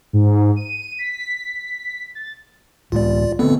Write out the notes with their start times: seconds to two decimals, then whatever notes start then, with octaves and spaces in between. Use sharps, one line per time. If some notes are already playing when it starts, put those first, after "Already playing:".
0.13 G#2
0.56 D#7
0.99 B6
2.15 A6
2.92 C#2 A2 G#3 F4 D5
3.39 D3 A3 B3 C4 A4